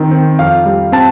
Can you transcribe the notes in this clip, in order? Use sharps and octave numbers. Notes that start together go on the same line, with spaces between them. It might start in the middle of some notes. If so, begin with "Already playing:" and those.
Already playing: D#3 C4
C4
F2 F5
G3
C4 A5